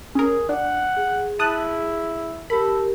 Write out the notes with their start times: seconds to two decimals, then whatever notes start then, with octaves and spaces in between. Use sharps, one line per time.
0.15 C#4 G#4 A#4
0.49 D4 F#5
0.97 G#4
1.39 E4 A5 D#6 F#6
2.50 G4 A4 A#4 B5